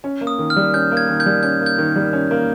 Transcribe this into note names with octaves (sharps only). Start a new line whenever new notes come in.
C#4
A#3
D#6
D#3
F6
G3
C#4 G6
A#3
G#6
D#3
G6
G3
C#4 G6
A#3
G6
D#3
G3
C#4
A#3